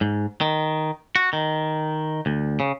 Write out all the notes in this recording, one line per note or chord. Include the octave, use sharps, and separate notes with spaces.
G#2
D#3
F#4
D#3
D2
C#3